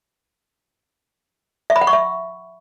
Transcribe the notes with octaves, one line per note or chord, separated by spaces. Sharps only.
E5
B5
F#5
C#6
E5